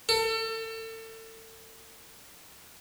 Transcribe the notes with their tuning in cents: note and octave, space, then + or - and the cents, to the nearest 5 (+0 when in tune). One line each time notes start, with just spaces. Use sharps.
A4 +30